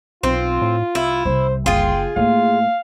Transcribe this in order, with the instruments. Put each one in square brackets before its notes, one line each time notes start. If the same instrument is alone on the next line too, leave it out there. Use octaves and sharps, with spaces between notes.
[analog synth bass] B1 [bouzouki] C4 [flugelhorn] F4
[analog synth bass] A2
[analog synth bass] C2 [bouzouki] E4
[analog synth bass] C2 [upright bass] C3 [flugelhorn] C5
[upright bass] F#1 [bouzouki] F4 G#4 [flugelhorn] G5
[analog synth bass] A2 [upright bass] A#3 D#4 [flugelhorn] F5